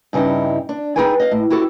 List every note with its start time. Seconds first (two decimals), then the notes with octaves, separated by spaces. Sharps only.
0.13 G2 C#3 G3 D#4 E4
0.69 D4
0.96 D#4 G#4 A4 B4 G5 G#5
1.20 D#5 F5
1.31 A2
1.50 E4 F#4 G4 A4